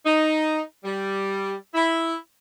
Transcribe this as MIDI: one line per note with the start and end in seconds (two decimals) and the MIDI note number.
0.05 0.62 63
0.84 1.56 55
1.74 2.15 64